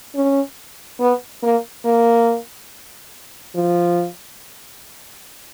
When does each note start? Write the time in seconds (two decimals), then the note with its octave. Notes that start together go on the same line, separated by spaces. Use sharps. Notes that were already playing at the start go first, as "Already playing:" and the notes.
0.15 C#4
1.00 B3
1.43 A#3
1.85 A#3
3.55 F3